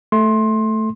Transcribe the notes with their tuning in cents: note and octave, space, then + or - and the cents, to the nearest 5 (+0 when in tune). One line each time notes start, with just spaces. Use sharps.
A3 +0 C6 +20